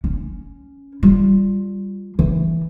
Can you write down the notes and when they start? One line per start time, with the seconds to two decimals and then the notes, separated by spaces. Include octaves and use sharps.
0.04 C#4
1.03 G3 F4
2.19 E3